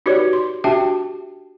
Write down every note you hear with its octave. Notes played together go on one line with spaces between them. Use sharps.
D#4 F#4 G4 B4 C#5 D5
C6
D4 F#4 G4 E5 G5 A5